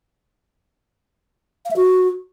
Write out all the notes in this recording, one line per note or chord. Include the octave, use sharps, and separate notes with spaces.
F5
E5
F#4